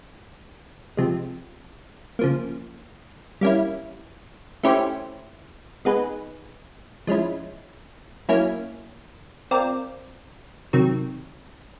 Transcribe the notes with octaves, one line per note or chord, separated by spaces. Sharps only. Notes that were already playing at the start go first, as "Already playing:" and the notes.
C3 F3 G#3
C#3 F3 A#3
G3 A#3 C#4 E4
A3 C#4 E4 G4 C5
G#3 B3 D#4 G#4 B4
F3 G#3 C#4 E4
F#3 A#3 C#4 E4
C4 F4 A#4 D5
C3 D#3 F#3